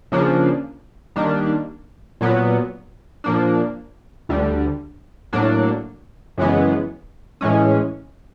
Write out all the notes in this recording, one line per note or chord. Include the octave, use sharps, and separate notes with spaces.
C#3 F3 A#3 D4
D#3 G3 A#3 D4
A#2 F#3 B3
A#2 F3 A#3 D4
D2 D3 G3
A2 F#3 A#3 D4
F#2 C#3 E3 G#3 B3
A2 E3 G#3 C#4